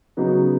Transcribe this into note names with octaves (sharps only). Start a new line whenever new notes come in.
C#3 F#3 B3 D#4 F#4